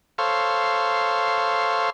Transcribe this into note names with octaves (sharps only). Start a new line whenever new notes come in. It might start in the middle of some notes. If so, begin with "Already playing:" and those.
A4 C5 C#5 F5